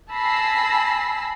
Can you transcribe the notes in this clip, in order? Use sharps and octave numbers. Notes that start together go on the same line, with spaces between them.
G#5 A5 B5 E6 A#6 C7